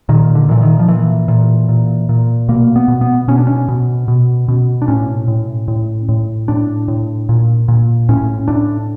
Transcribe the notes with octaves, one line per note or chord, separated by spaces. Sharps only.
A#2 D#3
D3
A#2 E3
D#3
F3
A#2 E3
A#2
A#2
A#2
B2 A#3
B3
B2
B3
B2 C#4
D4
C#4
B2
B2
B2
D4
A2 C#4
A2
A2
A2
A2 D4
A2
A#2
A#2
A2 C#4
A2 D4